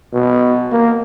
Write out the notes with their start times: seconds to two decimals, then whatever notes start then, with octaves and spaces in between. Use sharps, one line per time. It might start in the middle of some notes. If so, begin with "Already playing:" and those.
0.13 B2
0.72 A#3